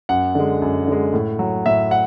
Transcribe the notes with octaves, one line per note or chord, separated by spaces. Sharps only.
F#2 F#5
D3 G#3
F#2
D3 G#3
A2
F#3
A2 E5
F#5